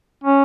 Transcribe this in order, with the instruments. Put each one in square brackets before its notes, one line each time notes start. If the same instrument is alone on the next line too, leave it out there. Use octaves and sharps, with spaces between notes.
[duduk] C#4